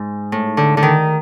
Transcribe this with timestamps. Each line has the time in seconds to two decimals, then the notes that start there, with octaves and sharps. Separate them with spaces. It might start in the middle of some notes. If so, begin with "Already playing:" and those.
Already playing: G#2
0.32 A2
0.57 D3
0.77 D3
0.82 D#3